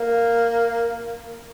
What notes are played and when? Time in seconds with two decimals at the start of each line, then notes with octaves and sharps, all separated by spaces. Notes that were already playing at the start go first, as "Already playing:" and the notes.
Already playing: A#3